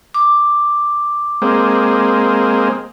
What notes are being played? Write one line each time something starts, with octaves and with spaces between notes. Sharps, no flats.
D6
G#3 A#3 C4